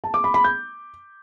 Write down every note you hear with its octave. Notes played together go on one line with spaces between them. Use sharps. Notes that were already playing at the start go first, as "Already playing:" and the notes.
A5
D6
B5
B5
G6